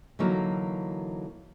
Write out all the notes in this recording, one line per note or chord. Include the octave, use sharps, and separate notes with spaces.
D3 E3 F#3 A#3 D#4